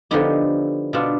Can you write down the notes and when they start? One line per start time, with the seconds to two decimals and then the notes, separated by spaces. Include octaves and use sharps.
0.11 D3 F3 B3 D#4 G4
0.93 B2 B3 D4 F4